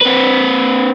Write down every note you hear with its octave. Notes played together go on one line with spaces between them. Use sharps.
C4 B4